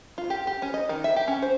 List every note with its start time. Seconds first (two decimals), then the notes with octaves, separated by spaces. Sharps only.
0.18 F4
0.30 G4
0.47 G4
0.62 C#4
0.74 D#5
0.89 D#3
1.04 E5
1.16 G4
1.28 C#4
1.42 C5